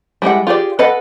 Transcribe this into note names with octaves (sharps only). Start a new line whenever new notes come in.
G3 G#3 E4 F#5
F4 G4 G#4 D5
A4 B4 D#5 F5 F#5